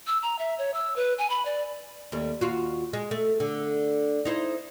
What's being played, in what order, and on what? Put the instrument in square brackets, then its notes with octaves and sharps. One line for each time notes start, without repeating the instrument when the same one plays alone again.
[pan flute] E6
A#5
E5
C#5
E6
B4
G#5
B5
D5
[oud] D#2 G3 A3
D#2 F4 F#4
G#3
A3
D3
D#4 E4 C5